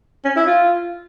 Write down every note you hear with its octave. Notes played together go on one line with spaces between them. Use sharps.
C#4
E4
F4